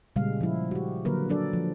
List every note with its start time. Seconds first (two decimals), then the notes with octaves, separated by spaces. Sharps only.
0.16 A#2 C#3 G3 G#3 F5
0.41 F3 E4
0.71 F#4 G4
1.05 D3 F#3 A#3 A#4 B4
1.29 F#3 D4 A4 D5
1.53 F3